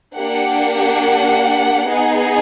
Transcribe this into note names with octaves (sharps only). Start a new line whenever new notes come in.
A#3 D4 G4 F#5
B3 D#4 G#4